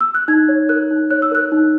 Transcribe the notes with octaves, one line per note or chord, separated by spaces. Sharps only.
E6
F#6
D#4 G#6
C#5
A#4 F#6
D#4
C#5 F#6
E6
A#4 F#6
D#4